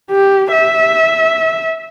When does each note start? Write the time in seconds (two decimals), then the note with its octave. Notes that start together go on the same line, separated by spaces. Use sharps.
0.11 G4
0.52 E5